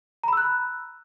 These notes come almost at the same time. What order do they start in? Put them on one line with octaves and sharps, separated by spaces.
A#5 B5 E6 F#6